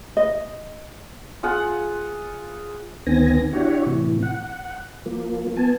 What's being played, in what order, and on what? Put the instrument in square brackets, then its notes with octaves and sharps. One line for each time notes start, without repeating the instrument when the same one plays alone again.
[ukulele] D#5
[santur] F4 G#4 F#5
[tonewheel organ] D2 D#3 B3 C4 G#5 A#6
D4 E4 F#4 G4 C#5
A2 C3 E3
F#5
F3 A#3
B3 G#5 A5